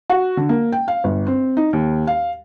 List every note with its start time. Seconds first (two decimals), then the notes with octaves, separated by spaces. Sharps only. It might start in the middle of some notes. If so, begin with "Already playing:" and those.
0.10 F#4
0.37 D3
0.49 A#3
0.72 G5
0.88 F5
1.04 G1
1.27 C4
1.57 D#4
1.73 D#2
2.07 F5